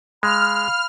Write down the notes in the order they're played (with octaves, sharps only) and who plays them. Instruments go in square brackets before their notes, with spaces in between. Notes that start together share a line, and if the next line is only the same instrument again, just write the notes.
[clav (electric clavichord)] G#3 [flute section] F5 B5 [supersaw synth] F6